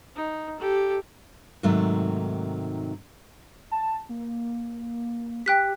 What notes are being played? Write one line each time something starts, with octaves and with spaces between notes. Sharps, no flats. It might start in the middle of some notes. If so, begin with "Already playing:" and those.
D#4
G4 A4
G#2 C3 D#3 F#3 A3
A5
A#3
G4 G5 F#6 B6